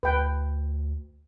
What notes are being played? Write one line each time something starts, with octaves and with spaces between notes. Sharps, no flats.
D2 B4 G5